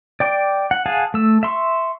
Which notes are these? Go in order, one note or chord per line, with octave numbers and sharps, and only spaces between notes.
D5 G5 D6
F#5
G#4 F5 F#5 G#5 A5
A3 E6
E5 C6 C#6